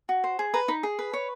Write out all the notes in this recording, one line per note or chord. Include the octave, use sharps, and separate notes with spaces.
F#4
C5
G#4
B4 A#5
D#4 B5
G#4
B4
C#5